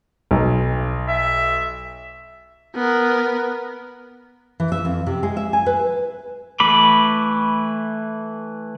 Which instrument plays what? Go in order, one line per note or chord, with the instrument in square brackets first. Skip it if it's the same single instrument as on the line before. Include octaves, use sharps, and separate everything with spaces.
[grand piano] B1
[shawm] E5
[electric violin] B3 A#4
[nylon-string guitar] E3
E5
F2
C3
G#3
E5
G#5
B4
[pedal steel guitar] E3 A3 B5 D6